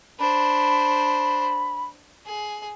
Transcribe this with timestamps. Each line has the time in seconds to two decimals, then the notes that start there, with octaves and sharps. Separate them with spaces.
0.19 D4 C5 B5
2.26 G#4